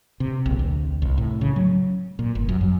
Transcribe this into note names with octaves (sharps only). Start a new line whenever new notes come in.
C3
A#1
D2
C2
A2
C#3
F#3
A#2
G1
F#2
F#2